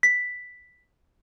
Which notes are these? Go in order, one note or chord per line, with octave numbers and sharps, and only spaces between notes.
B6